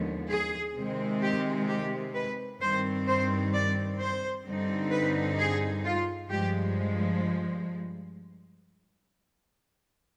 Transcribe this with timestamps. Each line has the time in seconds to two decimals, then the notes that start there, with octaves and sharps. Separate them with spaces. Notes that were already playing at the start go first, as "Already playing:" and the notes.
Already playing: D#2 D3 F3 G#3 B3
0.30 G#4
0.76 C3 D#3 G#3 C4
1.21 G4
1.68 G4
2.14 B4
2.60 G2 D#3 G3 C4 C5
3.07 C5
3.53 D5
3.98 C5
4.44 G2 D3 G3 C4 D#4
4.91 B4
5.38 G#4
5.84 F4
6.29 G2 F3 G#3 G4